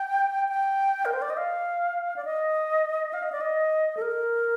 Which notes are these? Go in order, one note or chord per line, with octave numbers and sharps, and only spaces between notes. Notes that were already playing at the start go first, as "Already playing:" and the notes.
Already playing: G5
G5
A#4
C5
D5
D#5
F5
D5
D#5
F5
D#5
D5
D#5
A4
A#4